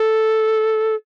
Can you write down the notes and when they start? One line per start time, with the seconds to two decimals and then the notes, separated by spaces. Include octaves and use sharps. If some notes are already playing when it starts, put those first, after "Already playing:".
Already playing: A4